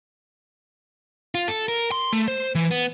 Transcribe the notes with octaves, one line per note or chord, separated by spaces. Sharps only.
F4
A4
A#4
C6
A3
C5
E3
B3